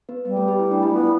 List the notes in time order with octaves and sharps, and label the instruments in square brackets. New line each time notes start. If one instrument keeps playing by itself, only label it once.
[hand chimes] B3 B4
[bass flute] G3 [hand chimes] B3 B4
[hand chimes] A3 A4
G4
E4
D4
E4
[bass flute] B3 [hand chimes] F4